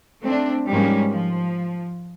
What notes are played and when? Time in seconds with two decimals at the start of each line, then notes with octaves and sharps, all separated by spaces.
0.20 A3 C4 D4
0.68 G#2 F3 G3 G#3 A#3 C#4
1.10 F3